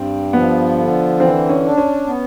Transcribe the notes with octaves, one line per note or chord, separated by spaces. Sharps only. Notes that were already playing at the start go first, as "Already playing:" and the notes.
Already playing: G2 C4
F3 B3
D3
E3 C4
C#4
D4
C#4
B3